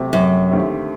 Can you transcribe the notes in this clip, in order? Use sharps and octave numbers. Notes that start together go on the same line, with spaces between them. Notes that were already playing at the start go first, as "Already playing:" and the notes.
Already playing: C3 F#3 A3 C4 G4
F#2
D#2 D3 A3 C4 G4